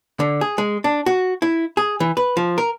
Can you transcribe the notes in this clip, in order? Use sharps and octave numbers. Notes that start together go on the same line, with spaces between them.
D3
G#4
G#3
D4
F#4
E4
G#4
E3
B4
F3
A#4